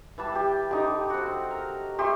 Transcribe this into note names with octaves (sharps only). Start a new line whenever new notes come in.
E3 G3 A5
G4
D3 D#4 G4
C4 F#4
A#4
G4 E5 C6 C#6